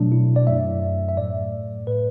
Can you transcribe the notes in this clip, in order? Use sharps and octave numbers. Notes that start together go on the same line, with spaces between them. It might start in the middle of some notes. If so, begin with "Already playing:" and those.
Already playing: B2 F#3 A3 D4
E4
D5
F#2 F#3 A3 E5
E5
A2 A3 D5
A2 A3 B4